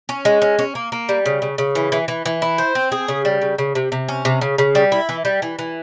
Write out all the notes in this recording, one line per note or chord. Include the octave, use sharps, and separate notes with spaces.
C#4
G#3
C#4
C#4
A#3
A#3
G3
C#3
C#3
C#3
E3
E3
E3
E3
E4
C5
C4
G#4
C#3
G3
C#3
C#3
C3
C3
C#4
C3
C#3
C#3
G3
E4
E3
G3
E3
E3